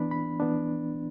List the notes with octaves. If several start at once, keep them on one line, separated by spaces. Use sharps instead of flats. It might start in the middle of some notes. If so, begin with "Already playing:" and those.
Already playing: E3 B3 D4 B5
B5
E3 B3 D4